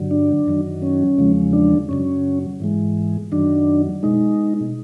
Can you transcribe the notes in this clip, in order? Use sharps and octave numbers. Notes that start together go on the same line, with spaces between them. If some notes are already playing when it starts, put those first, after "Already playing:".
Already playing: G2 D3 F#3
D4
F#2 D#3 F#3
C#4
E2 C#3 F3 G#3
D4
F#2 C#3 F#3 C#4
G#2 E3 G#3
F#2 D#3 F#3 D4
B2 G#3 D#4